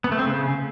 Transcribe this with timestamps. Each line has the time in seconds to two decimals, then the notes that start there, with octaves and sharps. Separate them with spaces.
0.04 B3
0.12 A3
0.19 C4
0.26 C#3